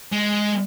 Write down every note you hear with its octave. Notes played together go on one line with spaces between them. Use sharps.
G#3